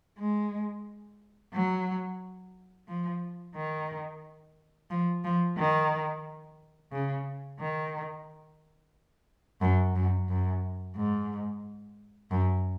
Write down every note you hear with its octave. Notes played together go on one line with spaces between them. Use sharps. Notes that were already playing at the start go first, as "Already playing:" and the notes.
G#3
F#3
F3
D#3
F3
F3
D#3
C#3
D#3
F#2
F#2
F#2
G#2
F#2